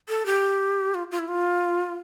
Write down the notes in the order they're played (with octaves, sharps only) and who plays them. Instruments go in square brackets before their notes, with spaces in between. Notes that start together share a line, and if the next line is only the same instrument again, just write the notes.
[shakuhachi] A4
G4
F4
F4
E4
F4